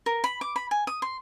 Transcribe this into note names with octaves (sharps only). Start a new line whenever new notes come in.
A#4
B5
D6
B5
G#5
D#6
C6